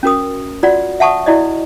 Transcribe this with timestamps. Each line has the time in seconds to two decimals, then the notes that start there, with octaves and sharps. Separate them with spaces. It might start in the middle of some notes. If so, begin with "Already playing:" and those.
0.03 C#4 F#4 A#4 D#6
0.63 F4 F#4 D5 F#5
1.00 E5 F#5 A5 C#6 D#6
1.26 E4 F#4 D5 D#5